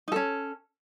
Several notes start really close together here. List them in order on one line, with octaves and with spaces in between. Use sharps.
D#4 A4 C#4